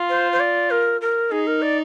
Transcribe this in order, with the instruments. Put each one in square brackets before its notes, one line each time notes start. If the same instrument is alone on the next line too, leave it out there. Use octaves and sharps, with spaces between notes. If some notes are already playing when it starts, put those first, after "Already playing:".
Already playing: [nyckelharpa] F4
[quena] C5
C5
D5
A#4
A#4
[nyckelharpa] D#4 [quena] G#4
[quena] A#4
D5